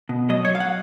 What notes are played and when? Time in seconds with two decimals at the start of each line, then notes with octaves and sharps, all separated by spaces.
0.09 B2
0.29 F#3 D#5
0.45 C#5
0.50 F#3 F5
0.60 F#5